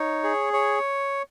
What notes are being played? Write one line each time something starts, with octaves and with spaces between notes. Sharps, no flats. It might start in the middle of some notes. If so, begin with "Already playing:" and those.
Already playing: D#4 C#5
G#4
C#5